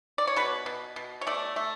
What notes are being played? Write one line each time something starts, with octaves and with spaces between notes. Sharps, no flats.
D5
C#5
B2 B4
B2
B2
C#5
A3 D5
A3